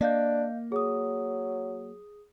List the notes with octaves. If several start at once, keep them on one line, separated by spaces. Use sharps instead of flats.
A#3 D4 D#5 F5 G6
F#3 G#4 D#6